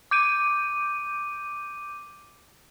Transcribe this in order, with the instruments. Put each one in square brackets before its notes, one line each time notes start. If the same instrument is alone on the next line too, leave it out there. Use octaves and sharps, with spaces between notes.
[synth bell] D6 G6 D7 D#7